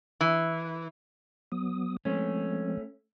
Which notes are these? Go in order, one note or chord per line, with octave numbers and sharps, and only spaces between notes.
E3
F#3 B3 D#6
F3 G#3 A3 C4 C#4